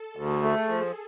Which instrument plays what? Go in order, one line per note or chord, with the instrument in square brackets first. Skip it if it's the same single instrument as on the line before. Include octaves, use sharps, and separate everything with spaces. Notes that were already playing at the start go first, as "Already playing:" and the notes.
Already playing: [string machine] A4
[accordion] D2 [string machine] G#4
[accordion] A3
F3